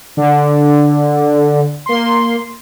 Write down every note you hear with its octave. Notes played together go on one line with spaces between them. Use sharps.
D3
A#3 C6